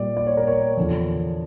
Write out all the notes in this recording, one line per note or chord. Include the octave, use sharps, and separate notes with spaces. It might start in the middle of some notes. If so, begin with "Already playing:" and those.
Already playing: A#2 G3 D5
D5
C#5
A#4
C#5
E2 D3 F3